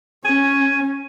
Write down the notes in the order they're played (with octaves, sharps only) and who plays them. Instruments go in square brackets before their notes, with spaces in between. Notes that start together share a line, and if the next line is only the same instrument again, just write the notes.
[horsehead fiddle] C#4 [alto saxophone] G#5